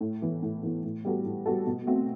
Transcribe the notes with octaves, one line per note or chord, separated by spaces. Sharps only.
A2
E3 B3
A2
E3 B3
A2
G3 B3 F#4 A4
A2
G3 B3 F#4 A4
B2
A3 C4 F#4